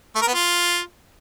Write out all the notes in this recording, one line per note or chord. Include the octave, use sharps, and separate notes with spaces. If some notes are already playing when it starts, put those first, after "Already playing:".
A3
A#4
B3
F4